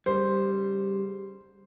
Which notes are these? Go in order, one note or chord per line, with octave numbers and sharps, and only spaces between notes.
C#3 G3 C5